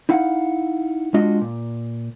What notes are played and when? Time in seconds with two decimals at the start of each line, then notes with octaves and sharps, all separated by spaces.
0.09 D#4 E4 F5 F#5
1.14 G#3 D4 F4 F#4 D#5
1.41 A#2